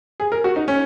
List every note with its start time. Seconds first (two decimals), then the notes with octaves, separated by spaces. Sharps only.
0.20 G#4
0.32 A#4
0.44 F#4
0.56 D#4
0.68 C#4